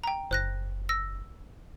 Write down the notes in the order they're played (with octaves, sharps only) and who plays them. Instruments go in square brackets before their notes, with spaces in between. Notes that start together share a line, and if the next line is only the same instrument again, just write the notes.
[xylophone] G5 A#5
[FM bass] F#1 [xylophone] C5 F#6 A#6
[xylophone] E6 A#6